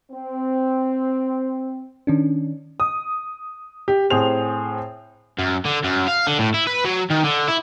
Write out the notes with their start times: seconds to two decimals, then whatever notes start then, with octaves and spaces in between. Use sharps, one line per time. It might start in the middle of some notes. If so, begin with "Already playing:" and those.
0.11 C4
2.07 D#3 C#4 D4
2.80 D#6
3.88 G4
4.10 A2 C4 G#4 C5 F7
5.39 F#2
5.65 D3
5.84 F#2
6.08 F5
6.27 D3
6.39 A2
6.54 E4
6.67 B4
6.85 F#3
7.10 D#3
7.23 D3
7.48 E4